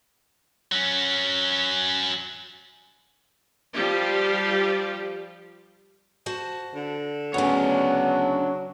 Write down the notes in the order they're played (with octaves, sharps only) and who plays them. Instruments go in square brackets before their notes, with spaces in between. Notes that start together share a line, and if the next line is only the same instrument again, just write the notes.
[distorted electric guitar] F#3 C#4
[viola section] F3 G3 G4
[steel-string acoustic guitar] F#4 C5 A5
[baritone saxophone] D3
[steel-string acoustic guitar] D2 C#3 [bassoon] F#3 [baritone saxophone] B3 [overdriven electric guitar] D4 C#5